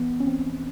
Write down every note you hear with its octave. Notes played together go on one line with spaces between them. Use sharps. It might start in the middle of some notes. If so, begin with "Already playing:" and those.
Already playing: E3 B3
C#4
E3 C4